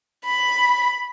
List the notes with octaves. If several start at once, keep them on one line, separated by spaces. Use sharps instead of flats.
B5